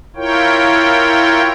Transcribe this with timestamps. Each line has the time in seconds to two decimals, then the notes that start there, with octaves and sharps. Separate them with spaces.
0.16 E4 F4 A#4 C#5 G5